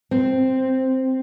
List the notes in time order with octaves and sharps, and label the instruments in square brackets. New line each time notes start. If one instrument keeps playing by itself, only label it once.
[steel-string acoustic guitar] C4